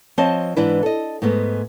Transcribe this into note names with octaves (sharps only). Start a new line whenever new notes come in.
F3 C4 C5 C#5 D#5 A5
G#2 E3 D4 E4 B4
A4 D#5
G#2 G#3 A3 B3